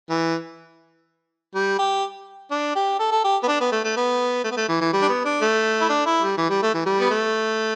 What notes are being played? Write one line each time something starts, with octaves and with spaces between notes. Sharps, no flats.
E3
G3
G4
D4
G4
A4
A4
G4
B3
D4
B3
A3
A3
B3
A3
B3
A3
E3
E3
G3
D4
B3
D4
A3
E4
D4
E4
G3
E3
G3
A3
E3
G3
B3
A3